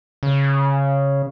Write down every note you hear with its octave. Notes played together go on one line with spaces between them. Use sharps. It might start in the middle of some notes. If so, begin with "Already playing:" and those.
C#3